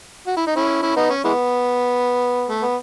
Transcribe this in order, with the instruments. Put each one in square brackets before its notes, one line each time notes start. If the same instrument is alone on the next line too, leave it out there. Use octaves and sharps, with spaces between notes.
[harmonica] F#4
E4
D#4
C#4 E4
C#4 E4
B3 D#4
C#4
E3 G#3 B3
A3
B3